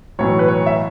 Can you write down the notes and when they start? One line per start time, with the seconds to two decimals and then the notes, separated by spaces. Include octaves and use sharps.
0.19 B1 A2 E3 C#5
0.39 B4
0.48 C#5
0.66 E5